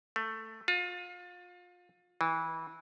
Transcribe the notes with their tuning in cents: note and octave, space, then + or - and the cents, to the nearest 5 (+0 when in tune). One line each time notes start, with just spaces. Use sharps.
A3 +10
F4 +30
E3 -20